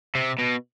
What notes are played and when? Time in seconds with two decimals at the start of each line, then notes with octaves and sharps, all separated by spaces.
0.15 C3
0.39 B2